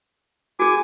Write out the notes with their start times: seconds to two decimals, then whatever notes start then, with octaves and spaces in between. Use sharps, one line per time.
0.59 F#4 G#4 G#5 D6